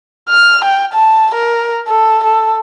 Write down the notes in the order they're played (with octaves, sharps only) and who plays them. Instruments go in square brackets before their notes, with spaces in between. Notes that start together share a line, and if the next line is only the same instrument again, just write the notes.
[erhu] F6
G5
A5
A#4
A4
A4